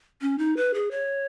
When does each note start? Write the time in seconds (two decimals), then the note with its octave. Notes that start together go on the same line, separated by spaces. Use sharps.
0.21 C#4
0.38 D#4
0.57 B4
0.74 G#4
0.91 C#5